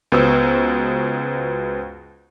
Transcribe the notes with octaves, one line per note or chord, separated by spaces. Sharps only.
C#2 B3 F#4 C5 D#6 E6